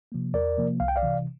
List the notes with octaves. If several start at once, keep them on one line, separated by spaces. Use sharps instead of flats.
C3 F3 A#3
E2 A#4 D5
C3 F3 A#3
C2 F5
G5
D5 F5
C3 E3